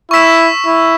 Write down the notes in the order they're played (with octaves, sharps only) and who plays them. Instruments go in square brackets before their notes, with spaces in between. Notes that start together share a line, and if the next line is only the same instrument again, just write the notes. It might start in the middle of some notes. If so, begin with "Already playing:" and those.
[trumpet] E4 [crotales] C#6 E6 B6 E7
[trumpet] E4